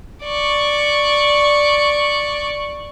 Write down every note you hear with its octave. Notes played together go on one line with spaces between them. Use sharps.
D5 C#6